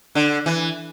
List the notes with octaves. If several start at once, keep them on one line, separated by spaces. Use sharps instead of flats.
D3
E3